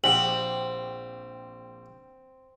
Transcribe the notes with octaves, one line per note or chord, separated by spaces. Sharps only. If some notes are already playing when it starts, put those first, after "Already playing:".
A#1 C4 G4 F#5 F#7